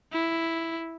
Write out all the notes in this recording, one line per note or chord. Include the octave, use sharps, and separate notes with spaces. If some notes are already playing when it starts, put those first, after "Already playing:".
E4